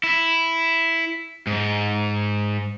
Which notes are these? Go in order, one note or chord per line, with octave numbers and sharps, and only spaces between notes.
E4
G#2